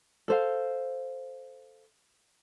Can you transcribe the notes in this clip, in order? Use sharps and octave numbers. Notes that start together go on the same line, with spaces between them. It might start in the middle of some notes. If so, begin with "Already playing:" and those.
A4 C5 F5